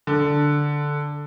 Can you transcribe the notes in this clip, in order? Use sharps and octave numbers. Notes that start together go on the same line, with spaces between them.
D3